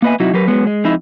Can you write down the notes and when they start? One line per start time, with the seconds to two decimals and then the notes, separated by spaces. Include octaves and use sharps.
0.02 A#3 B3 B4 D#5 E5 G#5
0.20 C3 F#3 D#4 E4 F#4
0.34 F#3 G4 A#4 B4
0.48 F#3 G#3 B3
0.67 G#3
0.84 F2 G#3 D#4 E4